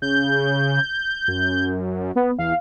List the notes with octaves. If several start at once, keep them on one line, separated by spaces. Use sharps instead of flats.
C#3 G6
F#2
B3
E2 F5